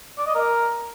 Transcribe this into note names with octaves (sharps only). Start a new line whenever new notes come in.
D5
D#5
A#4